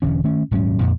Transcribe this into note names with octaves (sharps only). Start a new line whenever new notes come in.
E1 D3 E3 C#4
D#3 A3 C#4
D#1 G#2 F#3 C#4
F2 A#2